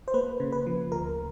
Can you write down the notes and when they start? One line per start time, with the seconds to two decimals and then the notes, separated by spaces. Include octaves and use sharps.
0.08 C5
0.14 A#3 B4
0.40 C#3
0.52 B4
0.66 F3
0.92 D2 A#4